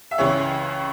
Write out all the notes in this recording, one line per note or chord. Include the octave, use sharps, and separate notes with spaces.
E5
C#2 C#3 E3 C#5